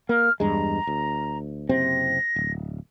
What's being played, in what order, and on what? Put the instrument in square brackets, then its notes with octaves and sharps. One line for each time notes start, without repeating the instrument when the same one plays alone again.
[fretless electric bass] A#3 [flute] F6
[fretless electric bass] E2 G2 G#3 [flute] A#5
[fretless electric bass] D2
[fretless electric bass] F#1 C3 C4 [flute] A#6
[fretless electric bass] D1